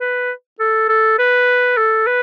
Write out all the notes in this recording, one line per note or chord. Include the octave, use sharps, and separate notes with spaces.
B4
A4
A4
B4
A4
B4